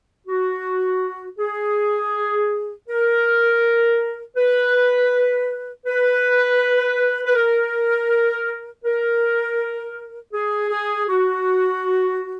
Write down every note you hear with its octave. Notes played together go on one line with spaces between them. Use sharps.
F#4
G#4
A#4
B4
B4
B4
A#4
A#4
G#4
G#4
F#4